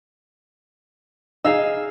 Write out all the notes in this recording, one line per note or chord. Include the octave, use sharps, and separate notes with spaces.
D#4 G#4 F5 E6